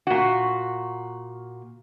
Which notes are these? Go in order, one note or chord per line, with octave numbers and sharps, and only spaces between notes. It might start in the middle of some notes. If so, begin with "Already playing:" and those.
A#2 F#4